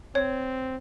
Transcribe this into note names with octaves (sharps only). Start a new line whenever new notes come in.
C4 C#5